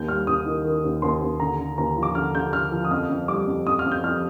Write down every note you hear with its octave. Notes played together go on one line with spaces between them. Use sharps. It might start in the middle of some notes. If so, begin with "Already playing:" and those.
Already playing: D#2 G6
G3 F6
D#2 D#6
D#3
D#3
D#2
D#2 C6
D#2
D3 A#5
D3
D#2 A#5
F3
D6
D3 F6
D3 G6
D3 F6
F3
D#6
F2 F6
F2
G3 D6
F2
F2 D#6
F6
F2
G6
F2 F6